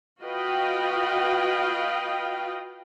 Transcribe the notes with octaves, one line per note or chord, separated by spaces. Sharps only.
F4 F#4 B4 D#5 F5 G5